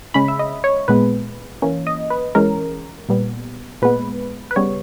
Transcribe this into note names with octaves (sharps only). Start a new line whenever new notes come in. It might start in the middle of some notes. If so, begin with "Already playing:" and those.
C#3 G#3 C#4 B5
E5
D#5
C#5
A#2 G#3 B3 B4
E3 A#3 C#4
D#5
B4
E3 G#3 C#4 A#4
A#2 G3 B3
A#2 G#3 B3 B4
B4
C#3 G3 B3 C#5